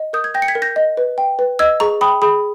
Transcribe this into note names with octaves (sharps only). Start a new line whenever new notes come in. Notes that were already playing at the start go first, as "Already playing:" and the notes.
Already playing: D#5
A#4 D#6 G6
G#6
G5 G6 A#6
C#7
G#6 B6
A#4
G6 A#6
D#5
B4
G5
B4
D#5 E6 G#6
G#4 A#5 C#6
G5 B5 D#6
G#4 B5 D#6